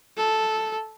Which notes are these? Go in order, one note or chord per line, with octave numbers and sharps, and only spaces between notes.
A4